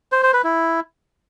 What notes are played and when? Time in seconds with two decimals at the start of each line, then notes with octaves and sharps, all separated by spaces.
0.12 C5
0.23 C5
0.33 B4
0.44 E4